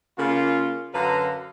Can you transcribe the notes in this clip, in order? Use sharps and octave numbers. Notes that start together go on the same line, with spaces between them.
C#3 A#3 F4
F#2 D3 B4 F5 A#5